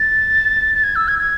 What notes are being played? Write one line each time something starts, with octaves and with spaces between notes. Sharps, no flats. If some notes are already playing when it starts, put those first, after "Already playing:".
Already playing: A6
A6
G#6
E6
G#6
G#6